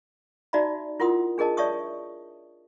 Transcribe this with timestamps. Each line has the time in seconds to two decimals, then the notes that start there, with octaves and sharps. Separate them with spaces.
0.53 D#4 F#4 D5 E5 A#5 B5
1.00 E4 F4 A#4 F#5 C6 D#6
1.38 D4 G#4 A#4 D#5 A5
1.57 C#5 D5 E5 A5 C#6 D#6